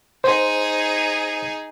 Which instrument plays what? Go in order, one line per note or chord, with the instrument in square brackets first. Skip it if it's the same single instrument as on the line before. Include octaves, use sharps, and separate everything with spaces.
[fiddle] D#4 G#4 [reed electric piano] C5